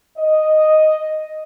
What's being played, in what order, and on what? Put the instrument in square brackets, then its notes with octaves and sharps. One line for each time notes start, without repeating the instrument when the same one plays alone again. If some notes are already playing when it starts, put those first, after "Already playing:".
[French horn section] D#5